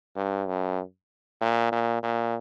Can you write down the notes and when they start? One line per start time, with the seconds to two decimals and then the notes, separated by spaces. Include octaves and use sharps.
0.16 G2
0.47 F#2
1.41 A#2
1.72 A#2
2.03 A#2